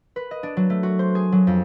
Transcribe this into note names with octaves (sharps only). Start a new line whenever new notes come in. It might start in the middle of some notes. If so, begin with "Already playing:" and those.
B4
D#5
D4
F#3
A3
F#4
C5
G#4
F#3
F2